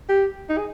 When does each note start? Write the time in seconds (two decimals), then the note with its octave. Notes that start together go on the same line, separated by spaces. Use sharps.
0.09 G4
0.49 D#4
0.58 G#4